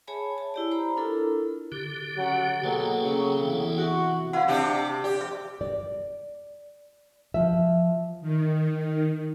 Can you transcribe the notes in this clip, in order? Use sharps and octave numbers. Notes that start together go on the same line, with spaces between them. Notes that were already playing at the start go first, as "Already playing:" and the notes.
G#4 C#5 E5 G#5 A5 B5
C#5 A5
E4 G4 D5
C5 A#5 B5
D4 E4 F4 A4 A#4
D3 G4
F#3 C#4 F#5
B2 F#3 A#3 G#4 A4 G5
C#3 F#3
E2 C3 E3
F#4
E4 F5 F#5
C3 D4 G4
G4 D5
E5
D5
F3 E5
D#3